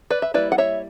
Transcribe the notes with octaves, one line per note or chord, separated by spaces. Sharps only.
B4 D5
E5
G3 A#3 E4 B4 D5
F#5
C#5 E5